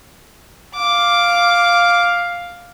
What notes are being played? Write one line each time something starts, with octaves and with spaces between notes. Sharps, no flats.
F5 D6